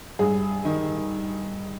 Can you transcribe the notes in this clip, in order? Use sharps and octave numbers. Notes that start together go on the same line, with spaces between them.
G2 G#4
D#3